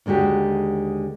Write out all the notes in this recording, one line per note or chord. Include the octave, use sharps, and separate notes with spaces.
D#2 D3 G#3 F#4 G4